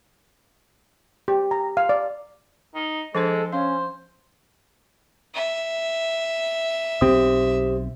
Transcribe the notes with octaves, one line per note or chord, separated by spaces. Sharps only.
G4
A#5
F5
D5
D#4
F3 G#3 D4 A4 C5
C#4 C5 F5
E5
B1 C4 G4 C5 D#6